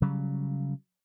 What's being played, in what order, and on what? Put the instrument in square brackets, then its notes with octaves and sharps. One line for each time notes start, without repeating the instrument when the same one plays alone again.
[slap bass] C#3 F#3 G3